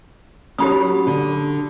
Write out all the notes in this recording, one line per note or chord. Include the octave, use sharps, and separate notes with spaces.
F#3 C#4 G4 B5 D#6
D3